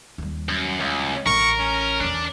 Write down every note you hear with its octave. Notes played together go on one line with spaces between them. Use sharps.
D#2 G3
F#2
C#2
A1 A2 A#4 C#6
C#4
E2 D3 D4